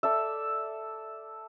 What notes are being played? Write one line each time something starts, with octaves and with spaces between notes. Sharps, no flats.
A4 D5 E5